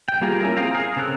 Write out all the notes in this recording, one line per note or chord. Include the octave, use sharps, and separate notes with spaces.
G5
G3 A#3 F4 G#4 A#4
C#4 E4 A#4
C4 G#4 F5 G5 A#5
G#4 F5
C#3 C4 A4 A#4 F#6